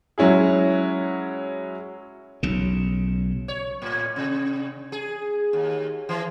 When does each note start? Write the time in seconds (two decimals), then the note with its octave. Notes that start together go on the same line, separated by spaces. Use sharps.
0.18 F#3 G#3 C#4 E4 G#4
2.43 B1 C#3
3.48 C#5
3.82 A2
4.16 C3
4.92 G#4
5.53 D#2
6.09 E3